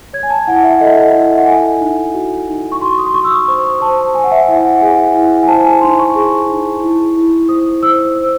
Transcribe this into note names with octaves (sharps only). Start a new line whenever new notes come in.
C#5 G#6
G#5
A5
E4 F#5
E5
A4 D#5
E5
D#5
E4 E5
F#5
A4 G#5
D#4
F#4
D#4
C#6
F#4 C6
D#6
C6
F#4 C#6
E6
D#6
C5 C#6
C5 A5
C5 G#5
F#5
E5
E4 E5
F#5
G#4 G#5
E4
G#5
C5 A5
G#5
A5
D#4 C6
C#6
G#4
D#4
E4
E4
C5 D#6
C5 E6
C5